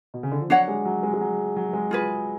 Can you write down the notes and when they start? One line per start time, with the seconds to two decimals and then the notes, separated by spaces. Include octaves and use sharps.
0.14 B2
0.23 C#3
0.32 D3
0.41 F3
0.50 F#3 D4 F#4 C#5 F#5
0.68 G#3
0.85 F#3
1.03 G#3
1.13 G#3
1.21 F#3
1.56 F#3
1.73 G#3
1.91 F4 G#4 B4